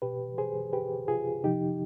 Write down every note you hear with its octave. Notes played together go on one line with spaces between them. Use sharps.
B2 G4 B4
G#4 C5
G4 B4
F4 G#4
C3 F3 D#4 G4